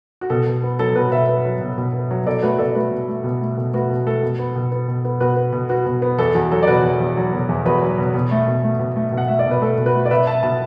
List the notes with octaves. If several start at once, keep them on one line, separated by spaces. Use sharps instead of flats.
F#4
B2 A4
B2
B3
F#3 A4
B2 F#4 B4
B2 B4 E5
B3
F#3
B2
B2
B3
F#3
B2 A4 D5
A3 F#4 B4
B2 A4 D5
A3 F#4 B4
B2
A3
B2
A3
B2
A3 F#4 B4
B2
A3 A4
B2
B3
B2
B3
B2
B3
B2 F#4 B4
B3
B2
B3 F#4
B2
B3
E2 A4
E2 F#4
F#3 A4
D5
B2 F#4 B4
E2
E2
F#3
B2
E2
E2 F#4 B4
F#3
B2
B2
A3
B2
A3
B2
A3
B2
F#5
A3 E5
D5
B2
B4
A3 A4
B2
F#4 B4
A3
D5
B2 B4 E5
B3 E5 A5
B2 E5 A5